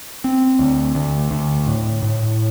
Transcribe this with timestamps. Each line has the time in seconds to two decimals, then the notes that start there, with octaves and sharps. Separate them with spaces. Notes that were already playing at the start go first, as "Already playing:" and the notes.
0.24 C4
0.59 D2
0.95 D2
1.31 D2
1.67 A2
2.03 A2